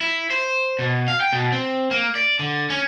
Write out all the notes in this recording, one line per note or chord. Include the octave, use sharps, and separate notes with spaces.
E4
C5
B2
F5
G5
B2
C4
A#3
D5
D3
C#4